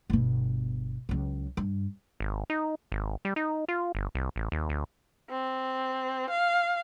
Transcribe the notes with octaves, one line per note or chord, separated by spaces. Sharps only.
G1 B2
C#2 F#3
G2
G#1
D#4
G#1
G3
D#4
F4
G1
C2
A1
D#2
D2
C4
F5